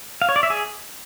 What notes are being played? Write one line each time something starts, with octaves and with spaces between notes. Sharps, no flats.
F5
C#5
D5
E5
G#4